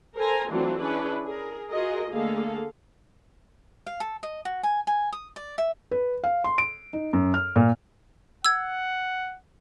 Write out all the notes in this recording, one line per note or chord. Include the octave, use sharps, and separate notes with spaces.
A4 A#4 C5 G#5 A#5
E3 F#3 A3 C4 D4 F4
C#4 D4 E4 G#4 B4
G#4 A#4
F4 F#4 G#4 A#4 D#5
D3 A3 A#3 G#4 A4 F5
F5
A4
D#5
F#4
G#5
G#5
D#6
D5
E5
B4
F5
C6
D7
D#4
F#2
F6
A#2
F#5 E6 G#6